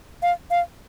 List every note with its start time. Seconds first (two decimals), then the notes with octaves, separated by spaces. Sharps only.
0.23 F5
0.51 F5